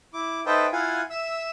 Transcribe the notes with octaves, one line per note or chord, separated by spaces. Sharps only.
E4 D6
D#4 A4 B4 C5 E5 G5
E4 F4 F5 F#5 G#5
E5 E6